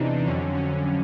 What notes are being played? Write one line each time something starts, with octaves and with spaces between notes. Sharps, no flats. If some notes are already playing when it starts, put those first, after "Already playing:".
Already playing: E2 C3 E3 D4 D#4
F2 D3 F#3 C#4
C#4